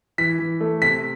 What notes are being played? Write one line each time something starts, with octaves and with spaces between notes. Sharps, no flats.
E3 B6
E3
A3
C3 B6